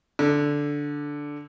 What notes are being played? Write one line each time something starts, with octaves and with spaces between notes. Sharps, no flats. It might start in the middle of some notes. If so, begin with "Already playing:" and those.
D3